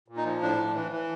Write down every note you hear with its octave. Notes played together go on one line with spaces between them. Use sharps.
A#2
D#4
F3
A2 D4
A2
E3
E3